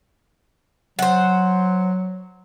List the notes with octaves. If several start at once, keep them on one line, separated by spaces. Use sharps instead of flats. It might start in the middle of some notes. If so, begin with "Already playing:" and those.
F#3 C5 F#5